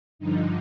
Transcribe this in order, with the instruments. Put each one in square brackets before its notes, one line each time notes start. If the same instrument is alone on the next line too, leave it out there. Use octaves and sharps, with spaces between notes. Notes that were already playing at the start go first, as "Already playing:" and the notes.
[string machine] G2 D3 F3 D#4